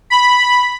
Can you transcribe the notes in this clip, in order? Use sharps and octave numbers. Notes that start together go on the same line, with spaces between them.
B5